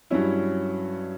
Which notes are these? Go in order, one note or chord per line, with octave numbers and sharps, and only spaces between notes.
G2 F#3 C#4 E4